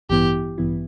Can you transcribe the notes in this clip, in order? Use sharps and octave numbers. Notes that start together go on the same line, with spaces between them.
A1 G2 E3 B3 E4 G4
A1 G2 E3 B3 E4